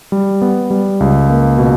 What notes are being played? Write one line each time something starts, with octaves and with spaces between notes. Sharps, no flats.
G3
B3
G3
C#2
A#3
B2